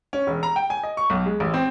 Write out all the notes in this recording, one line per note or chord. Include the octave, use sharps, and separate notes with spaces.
C#4
E1
A#5
G5
G#5
D#5
C#6
B1
G#3
A1
C4